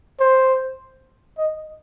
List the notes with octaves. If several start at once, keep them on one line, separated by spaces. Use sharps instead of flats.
C5
D#5